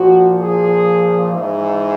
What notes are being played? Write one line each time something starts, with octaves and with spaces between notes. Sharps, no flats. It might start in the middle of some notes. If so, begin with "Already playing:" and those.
Already playing: A#2 F3 F#4
G#4
G#2 E3